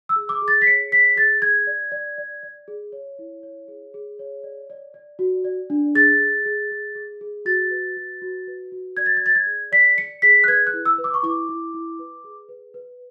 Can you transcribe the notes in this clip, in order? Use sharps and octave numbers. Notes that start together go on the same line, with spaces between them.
E6
G#4
D6
G#4
A6
B6
C#5 C#7
G#4 B6
G#4 A6
G#4 G#6
D5
D5
D5
D5
G#4
C#5
E4
C#5
G#4
G#4
C#5
D5
D5
D5
F#4
D5
D4
G#4 A6
G#4
G#4
G#4
G#4
G#4
F#4 A6
B4
F#4
F#4
B4
F#4
D5 G#6
A6
G#6
D5 A6
G#6
G#4
D5 B6
D5 C#7
G#4 B6
F#6
B4 G#6
F#6
E4
E6
B4
D6
C#6
E4 D6
E4
E4
B4
G#4
B4
B4